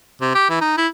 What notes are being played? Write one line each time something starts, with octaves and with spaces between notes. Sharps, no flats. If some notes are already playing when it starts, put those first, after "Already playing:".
C3
G4
E3
D#4
E4